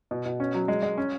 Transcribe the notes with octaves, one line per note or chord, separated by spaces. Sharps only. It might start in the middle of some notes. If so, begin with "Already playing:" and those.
B2
B2
C#4
F#3
G#3
G#3
C#4